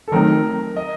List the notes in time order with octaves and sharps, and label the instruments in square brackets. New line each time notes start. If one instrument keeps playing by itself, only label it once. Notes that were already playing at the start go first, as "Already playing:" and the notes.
[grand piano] A4
[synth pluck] D#3 F#3 A3 C4 D#4 [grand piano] A#4
[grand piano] D#5